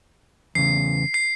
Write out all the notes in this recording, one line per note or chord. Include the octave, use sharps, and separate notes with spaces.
E2 C#3 C7
C7